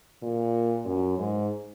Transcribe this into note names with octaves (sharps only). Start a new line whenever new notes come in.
A#2
F#2
G#2